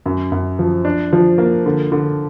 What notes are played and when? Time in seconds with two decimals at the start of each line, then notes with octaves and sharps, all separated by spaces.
0.06 F#2
0.32 F#2
0.59 F3
0.85 D4
1.13 F3
1.38 A#3
1.66 D3
1.92 D3